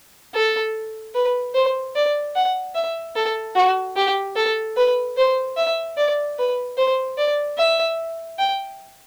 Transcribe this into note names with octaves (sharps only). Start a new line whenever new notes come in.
A4
B4
C5
D5
F#5
E5
A4
F#4
G4
A4
B4
C5
E5
D5
B4
C5
D5
E5
G5